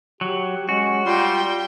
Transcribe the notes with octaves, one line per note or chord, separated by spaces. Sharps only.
F#3 G4
G#3 C#4 F#4
G3 F4 G5 C6